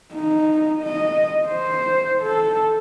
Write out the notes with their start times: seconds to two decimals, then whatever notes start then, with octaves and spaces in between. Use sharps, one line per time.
0.14 D#4
0.82 D#5
1.47 C5
2.22 A4